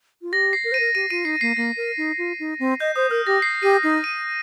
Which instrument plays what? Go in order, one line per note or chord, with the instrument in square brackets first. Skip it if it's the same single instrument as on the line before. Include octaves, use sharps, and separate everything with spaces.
[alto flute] F4
[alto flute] G4 [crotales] A#6
[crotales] C7
[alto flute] A#4
[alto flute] C5 [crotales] D#7
[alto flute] A#4
[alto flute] G4 [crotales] D#7
[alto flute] F4 [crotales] D#7
[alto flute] D#4 [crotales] C7
[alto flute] A#3 [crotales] C7
[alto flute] A#3 [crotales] A#6
[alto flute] A#4
D#4
F4
D#4
C4
[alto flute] D#5 [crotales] G6
[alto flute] C5 [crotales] D#6
[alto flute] A#4 [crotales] F6
[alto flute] G4 [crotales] A#6
[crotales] C7
[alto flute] G4 [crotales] D#7
[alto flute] D#4 [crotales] C7
[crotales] D#7